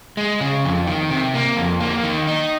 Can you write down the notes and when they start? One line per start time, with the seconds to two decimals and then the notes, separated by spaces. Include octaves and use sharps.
0.17 G#3
0.41 C#3
0.64 F2
0.87 D#3
1.10 C3
1.34 A#3
1.57 F2
1.81 A#3
2.03 D#3
2.27 D#4